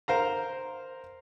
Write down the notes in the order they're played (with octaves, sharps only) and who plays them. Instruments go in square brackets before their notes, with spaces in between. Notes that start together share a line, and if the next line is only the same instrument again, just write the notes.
[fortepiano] A#4 C5 F5 A#5